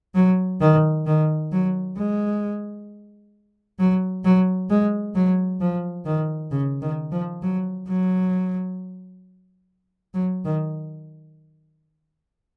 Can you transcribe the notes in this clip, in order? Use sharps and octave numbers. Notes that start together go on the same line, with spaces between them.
F#3
D#3
D#3
F#3
G#3
F#3
F#3
G#3
F#3
F3
D#3
C#3
D#3
F3
F#3
F#3
F#3
D#3